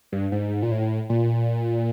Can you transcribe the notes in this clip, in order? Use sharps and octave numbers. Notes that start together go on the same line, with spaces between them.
G2
G#2
A#2
A2
A#2